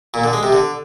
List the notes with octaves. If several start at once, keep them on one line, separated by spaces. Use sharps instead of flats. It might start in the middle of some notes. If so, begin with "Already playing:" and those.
A#2
D3
G#3
C3
D3